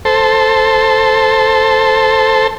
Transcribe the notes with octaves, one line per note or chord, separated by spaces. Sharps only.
A4 C5